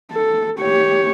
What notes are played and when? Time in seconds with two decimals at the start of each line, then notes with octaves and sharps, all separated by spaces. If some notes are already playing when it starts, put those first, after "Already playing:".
0.12 A4
0.60 G4 C#5